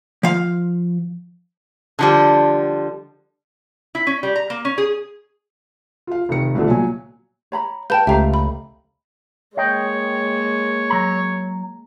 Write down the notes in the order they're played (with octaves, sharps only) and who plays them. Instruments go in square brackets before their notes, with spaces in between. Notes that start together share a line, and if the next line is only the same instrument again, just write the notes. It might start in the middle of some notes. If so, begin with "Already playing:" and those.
[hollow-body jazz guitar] F3 F5
[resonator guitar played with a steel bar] D3 F3 G3
E4
C#4
G3
A#5
A#3
C#4
G#4
[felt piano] F4 F5
F1 C3 D#3 C#7
C2 B2 D3 F3 A3
A#2 F#3 G#5
[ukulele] C#5 A#5 B5
[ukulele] B4 G5 [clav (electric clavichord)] F5 [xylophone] A5 G6
[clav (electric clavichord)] C#2 A3 [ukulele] G4 F5 [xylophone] E5 A#5
[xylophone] B5
[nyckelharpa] G#3 A#3 [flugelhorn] C#5 [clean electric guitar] D#5 G5
[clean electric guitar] F#3 A#5